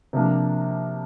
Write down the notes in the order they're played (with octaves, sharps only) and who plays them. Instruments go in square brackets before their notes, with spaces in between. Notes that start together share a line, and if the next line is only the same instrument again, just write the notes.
[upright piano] C3 F3 A#3 D4